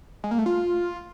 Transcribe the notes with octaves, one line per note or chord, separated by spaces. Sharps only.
G#3
A#3
A3
F4